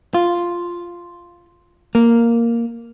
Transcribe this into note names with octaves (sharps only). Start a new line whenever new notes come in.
F4
A#3